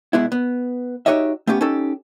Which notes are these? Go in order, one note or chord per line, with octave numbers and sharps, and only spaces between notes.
B2 G#3 B3 E4
B3
D#4 F#4 G4 C#5 D#5 E5
A3 B3 C#4 G4
C#4 D#4 G4 A4